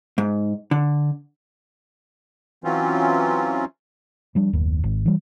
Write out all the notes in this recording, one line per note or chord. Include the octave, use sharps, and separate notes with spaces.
G#2
D3
E3 F#3 C4 C#4 F4
F3 G3 D4
F#1 D#2
G#1
E3 G3